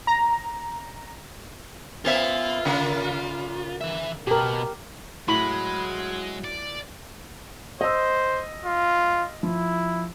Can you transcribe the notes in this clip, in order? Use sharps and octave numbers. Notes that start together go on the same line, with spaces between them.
A#5
A#3 B3 F4 E5
C#3 A#3
E3 E5
B2 G4 A#4
A2 F#3 G#3 B5
D5
C5 D#5 E6
F4
F3 E4